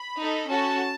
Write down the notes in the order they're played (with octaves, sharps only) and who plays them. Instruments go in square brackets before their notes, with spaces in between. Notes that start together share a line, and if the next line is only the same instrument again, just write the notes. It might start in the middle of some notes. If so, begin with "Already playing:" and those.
Already playing: [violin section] B5
D#4 A4
C#4 F#4 A4 A5